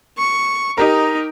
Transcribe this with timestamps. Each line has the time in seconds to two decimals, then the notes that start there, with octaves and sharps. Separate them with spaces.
0.17 C#6
0.78 D#4 G4 A#4 D#5